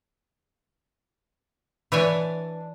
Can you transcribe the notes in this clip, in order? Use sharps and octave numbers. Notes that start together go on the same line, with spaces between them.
E3 D4 B4 C#5 E5 G#5